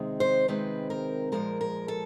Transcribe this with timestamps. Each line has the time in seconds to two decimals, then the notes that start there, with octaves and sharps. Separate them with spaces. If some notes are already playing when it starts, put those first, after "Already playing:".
Already playing: C3 D#3 G#3 C4
0.20 C5
0.48 C3 D#3 G#3 C4 B4
0.90 A#4
1.32 A#2 F3 G#3 A#4
1.61 A#4
1.88 A4